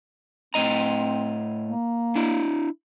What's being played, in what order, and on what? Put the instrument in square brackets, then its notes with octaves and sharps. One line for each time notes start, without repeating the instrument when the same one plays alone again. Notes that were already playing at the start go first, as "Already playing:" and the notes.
[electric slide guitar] A2 D#5 A#5 [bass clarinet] C4
[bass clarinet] A#3
[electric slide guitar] D4 E4